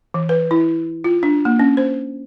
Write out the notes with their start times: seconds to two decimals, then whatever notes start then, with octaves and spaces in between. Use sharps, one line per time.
0.14 E3
0.29 B4
0.51 E4
1.04 F4
1.23 D4
1.45 A#3
1.59 C#4
1.77 C5